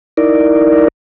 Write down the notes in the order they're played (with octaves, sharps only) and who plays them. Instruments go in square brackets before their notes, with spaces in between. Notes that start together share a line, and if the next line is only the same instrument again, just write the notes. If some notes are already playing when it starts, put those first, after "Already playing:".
[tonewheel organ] D#4 E4 A#4 D5